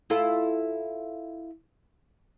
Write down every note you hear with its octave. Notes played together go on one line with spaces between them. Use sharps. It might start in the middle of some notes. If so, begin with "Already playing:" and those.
E4 F4 A4